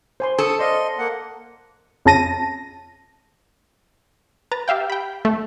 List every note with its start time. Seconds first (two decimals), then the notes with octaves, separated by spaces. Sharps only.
0.20 C5 G#5 C6
0.38 A4 C#6 D#6
0.59 C5 D5 D#5 F5 C6
0.98 A#3 F#5
2.05 F2 C#3 A5 A#6 D#7
4.52 B4 A#5 A6
4.68 G4 E5 F5 G5
4.90 G5 B5
5.25 A3